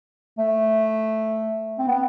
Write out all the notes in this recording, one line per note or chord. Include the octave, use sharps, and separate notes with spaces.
A3
C4
B3